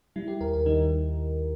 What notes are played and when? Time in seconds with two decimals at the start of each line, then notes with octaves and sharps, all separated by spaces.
0.16 G3 E4
0.28 G4
0.40 D#2 A#4
0.53 A#4
0.66 D#3 D#4